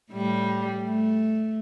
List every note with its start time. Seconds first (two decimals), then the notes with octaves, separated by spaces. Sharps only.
0.11 A2 G3
0.84 A3